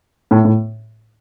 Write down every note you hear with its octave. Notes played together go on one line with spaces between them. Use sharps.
A2
A2